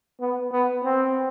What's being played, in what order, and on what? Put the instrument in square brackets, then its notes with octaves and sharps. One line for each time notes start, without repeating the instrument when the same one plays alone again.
[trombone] B3
B3
C4